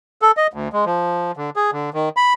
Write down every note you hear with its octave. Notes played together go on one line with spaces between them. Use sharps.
A4
D#5
D2
G#3
F3
D3
G#4
D3
D#3
B5